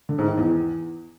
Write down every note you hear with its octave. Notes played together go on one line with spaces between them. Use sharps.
D3
G#2
D#3
E2